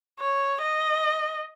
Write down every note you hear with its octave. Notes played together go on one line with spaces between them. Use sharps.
C#5
D#5